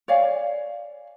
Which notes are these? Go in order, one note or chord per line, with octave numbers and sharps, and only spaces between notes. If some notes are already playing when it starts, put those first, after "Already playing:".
C#5 D5 F5 G#5